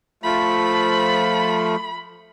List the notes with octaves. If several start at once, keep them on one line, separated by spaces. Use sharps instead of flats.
F3 A3 B5